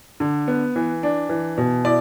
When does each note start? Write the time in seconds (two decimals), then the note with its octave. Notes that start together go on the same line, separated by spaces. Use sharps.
0.20 D3
0.48 B3
0.76 E3
1.03 D4
1.29 E3
1.58 B2
1.85 E4 D5